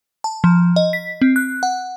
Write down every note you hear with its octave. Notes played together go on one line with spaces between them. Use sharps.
A5
F3
D#5
B6
C4
F#6
F#5